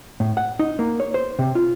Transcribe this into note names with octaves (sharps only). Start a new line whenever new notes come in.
A2
F#5
D#4
A#3
C#5
C5
C3
F4